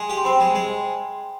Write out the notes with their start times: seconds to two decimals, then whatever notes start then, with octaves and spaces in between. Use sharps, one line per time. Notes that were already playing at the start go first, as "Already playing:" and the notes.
Already playing: G#3 G#5 C6
0.09 G4
0.18 C6
0.25 C4 G5 B5
0.40 G#3
0.55 G#3